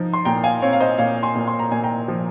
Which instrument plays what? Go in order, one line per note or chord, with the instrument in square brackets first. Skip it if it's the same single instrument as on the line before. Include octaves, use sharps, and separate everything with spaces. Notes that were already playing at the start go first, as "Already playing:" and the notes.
Already playing: [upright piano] F3 D#4
C6
A#2 G5 A#5
F5 G#5
C4 C#5 F5
F5
C5 D#5
A#2 C#5 F5
G#5 C6
A#2
C6
A#5
A#2 G#5
G5 A#5
F3